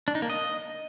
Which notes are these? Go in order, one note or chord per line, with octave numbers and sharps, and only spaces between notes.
D4
D#4
A#3
D#5